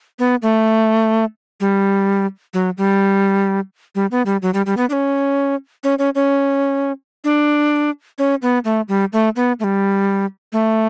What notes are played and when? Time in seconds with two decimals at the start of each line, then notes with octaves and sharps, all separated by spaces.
0.19 B3
0.42 A3
1.60 G3
2.54 F#3
2.78 G3
3.95 G3
4.11 B3
4.26 G3
4.42 F#3
4.54 G3
4.66 G3
4.77 B3
4.89 D4
4.93 C#4
5.84 C#4
5.99 C#4
6.15 C#4
7.24 D4
8.18 C#4
8.42 B3
8.65 A3
8.88 G3
9.13 A3
9.36 B3
9.60 A3
9.64 G3
10.53 A3